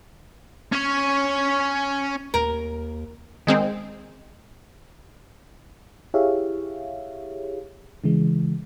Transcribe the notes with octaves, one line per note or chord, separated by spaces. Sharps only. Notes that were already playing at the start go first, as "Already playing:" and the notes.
C#4 C#5
D#2 A#4
D#3 G#3 C4
E4 G4 G#4 C#5 E5 F5
C#3 E3 G#3